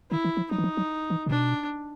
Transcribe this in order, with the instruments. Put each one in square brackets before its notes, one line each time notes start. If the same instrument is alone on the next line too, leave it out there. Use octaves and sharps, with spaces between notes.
[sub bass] D#3 [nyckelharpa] E4
[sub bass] E3
F3
[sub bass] F#3 [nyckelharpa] D#4
[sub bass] E3
F3
F#3
E3
C3
[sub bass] B2 [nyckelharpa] D4